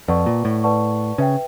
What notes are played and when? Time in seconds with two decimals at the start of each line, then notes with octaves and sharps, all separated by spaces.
0.08 F2 B4 D5 F#5 A5 C#6
0.26 A#2
0.45 A2
0.64 B4 D5 F#5 A5 C#6
1.18 C#3 B4 E5 G5